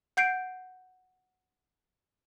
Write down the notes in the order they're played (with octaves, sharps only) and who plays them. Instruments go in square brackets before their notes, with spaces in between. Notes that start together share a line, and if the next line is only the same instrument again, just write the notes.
[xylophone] F#5 G6 C7 D7